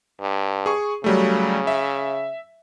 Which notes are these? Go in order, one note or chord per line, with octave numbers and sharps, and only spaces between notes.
G2
G#4 C#6
C#3 F#3 G3 A3
E5